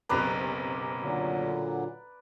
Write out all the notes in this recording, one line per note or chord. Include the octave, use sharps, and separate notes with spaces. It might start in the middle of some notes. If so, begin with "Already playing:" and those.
F#1 B1 C3 B4 D5 A#5
A#2 D3 F#3